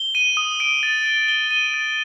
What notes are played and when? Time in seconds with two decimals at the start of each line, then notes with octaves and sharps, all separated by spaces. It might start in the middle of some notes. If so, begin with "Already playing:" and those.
Already playing: G7
0.15 D#7
0.37 D#6
0.60 D7
0.83 A6
1.06 G7
1.28 G7
1.51 D#7
1.74 A6